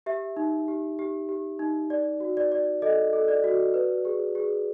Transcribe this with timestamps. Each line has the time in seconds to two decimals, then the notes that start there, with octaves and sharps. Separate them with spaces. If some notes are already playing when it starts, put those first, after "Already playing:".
0.06 G4 E5
0.37 D#4
0.68 G4
0.99 G4
1.29 G4
1.59 D#4
1.90 D5
2.20 F#4
2.37 D5
2.52 D5
2.82 A4 D#5
3.13 A4
3.28 D5
3.44 F#4
3.74 B4
4.05 G#4
4.35 G#4